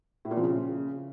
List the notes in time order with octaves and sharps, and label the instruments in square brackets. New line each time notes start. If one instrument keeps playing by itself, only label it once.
[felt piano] A2
A#2
F3
C#3